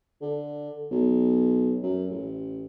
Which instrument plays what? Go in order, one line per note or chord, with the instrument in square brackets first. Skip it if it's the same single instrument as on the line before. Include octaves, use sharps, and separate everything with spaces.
[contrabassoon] D3
B1
F#2
A1